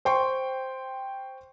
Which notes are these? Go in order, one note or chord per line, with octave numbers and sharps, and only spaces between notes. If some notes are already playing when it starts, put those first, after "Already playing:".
C5 G5 C6 C#6